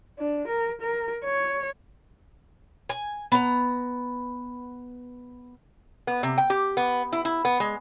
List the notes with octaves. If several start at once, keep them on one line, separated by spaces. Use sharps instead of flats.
D4
A#4
A#4
C#5
G#5
B3 A#5
B3
C3
G5
G4
B3
E4
E4
B3
G#3